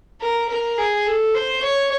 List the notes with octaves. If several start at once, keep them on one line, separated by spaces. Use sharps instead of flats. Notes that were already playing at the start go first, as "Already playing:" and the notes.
A#4
A#4
G#4
A4
C5
C#5